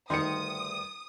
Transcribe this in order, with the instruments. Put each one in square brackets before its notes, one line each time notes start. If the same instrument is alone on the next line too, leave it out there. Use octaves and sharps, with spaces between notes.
[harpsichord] D2 G2 A3 [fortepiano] D#3 [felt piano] C6 C#7 [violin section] D#6